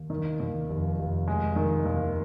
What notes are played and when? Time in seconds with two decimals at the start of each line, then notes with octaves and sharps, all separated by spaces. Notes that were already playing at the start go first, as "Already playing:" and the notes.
Already playing: D#2
0.10 D#3
0.40 D#2
0.69 F1
0.98 F1
1.28 G#3
1.56 D#3
1.86 D#2